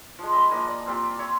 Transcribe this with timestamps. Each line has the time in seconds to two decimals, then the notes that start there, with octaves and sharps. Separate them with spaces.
0.19 F3 G#3
0.32 D#5 E5 G#5 B5
0.51 F3 A#3 D#5 F#5
0.67 D5
0.86 A#3 C4 F4 G4
1.19 C#5 E5 C6 E6